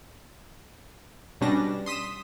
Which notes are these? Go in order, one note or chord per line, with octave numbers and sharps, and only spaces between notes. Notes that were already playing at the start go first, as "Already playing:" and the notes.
B2 G3 C#4 D4 A#6
C6 D#6 B6 D#7 E7